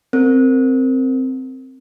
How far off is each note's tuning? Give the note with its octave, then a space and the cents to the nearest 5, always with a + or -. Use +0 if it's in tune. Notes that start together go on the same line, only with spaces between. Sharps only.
C4 +0 A#4 -15